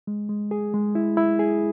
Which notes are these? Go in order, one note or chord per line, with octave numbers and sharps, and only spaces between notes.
G#3
G#3
G#4
G#3
E4
E4
G#4